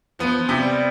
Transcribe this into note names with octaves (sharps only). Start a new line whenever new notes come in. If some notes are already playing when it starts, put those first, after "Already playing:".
F3 B3
F3
C3
G3